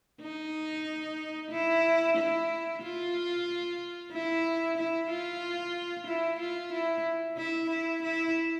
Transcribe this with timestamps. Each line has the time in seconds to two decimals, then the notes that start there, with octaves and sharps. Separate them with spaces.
0.22 D#4
1.51 E4
2.17 E4
2.82 F4
4.12 E4
4.78 E4
5.09 F4
6.07 E4
6.40 F4
6.73 E4
7.37 E4
7.70 E4
8.03 E4